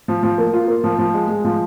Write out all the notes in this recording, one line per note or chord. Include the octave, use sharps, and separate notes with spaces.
F3
F3
A#3
F4
A#3
F3
F3
G#3
G#3
F3